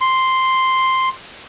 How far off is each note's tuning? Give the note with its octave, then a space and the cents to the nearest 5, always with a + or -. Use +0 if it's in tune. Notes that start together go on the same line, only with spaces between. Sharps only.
C6 +0